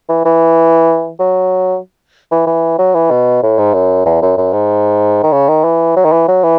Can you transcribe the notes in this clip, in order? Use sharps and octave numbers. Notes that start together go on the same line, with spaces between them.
E3
E3
F#3
E3
E3
F#3
E3
B2
A2
G#2
F#2
E2
F#2
F#2
G#2
D#3
C#3
D#3
E3
F#3
D#3
E3
F#3
E3